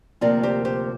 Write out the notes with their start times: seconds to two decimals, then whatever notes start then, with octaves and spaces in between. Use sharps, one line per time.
0.21 D2 C3 F3 A#3 F4 A#4 D5
0.43 G4 C5
0.65 G4 C5